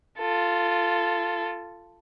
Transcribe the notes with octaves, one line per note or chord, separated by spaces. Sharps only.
F4 A4